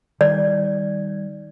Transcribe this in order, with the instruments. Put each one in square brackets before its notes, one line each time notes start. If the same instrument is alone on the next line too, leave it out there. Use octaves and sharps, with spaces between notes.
[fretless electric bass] D#3 G3 [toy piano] D5